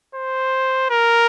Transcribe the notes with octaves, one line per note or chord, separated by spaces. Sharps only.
C5
A#4